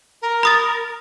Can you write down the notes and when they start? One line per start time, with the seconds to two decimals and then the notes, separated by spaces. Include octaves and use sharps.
0.21 A#4
0.43 B5 D#6 A6